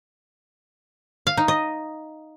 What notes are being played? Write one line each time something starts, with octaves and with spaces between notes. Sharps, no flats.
F5
D#4
D#5